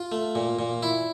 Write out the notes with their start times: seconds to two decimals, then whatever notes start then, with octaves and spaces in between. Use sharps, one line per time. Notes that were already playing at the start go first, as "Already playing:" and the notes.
Already playing: F4
0.12 A3
0.35 A#2
0.59 A#2
0.83 E4